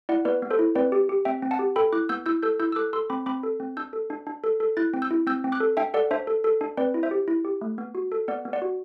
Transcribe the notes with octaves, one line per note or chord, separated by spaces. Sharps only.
E4 D5 F#5
B3 B4 D5
B3
A4 C5
E4
C4 B4 D5
G4
G4
C4 E5 G5
C4
F#5 A5
G4
A4 G5 B5
E4 D6 F#6
B3 E6 G6
E4 E6 G6
A4 E6 G6
E4 E6 G6
E6
A4 D6 F#6
A4 C6 E6
C4 B5 D6
C4 B5 D6
A4
C4
D4 E6 G6
A4
D4
D4
A4
A4
E4 F#6 A6
C4
E6 G6
E4
C4 E6 G6
C4
D6 F#6
A4
D4 E5 G5
A4 D5 F#5
D4 C5 E5
A4
A4
D4
C4 B4 D5
E4
C5 E5
G4
E4
G4
A3
B3
F#4
A4
B3 D5 F#5
B3
D5 F#5
F#4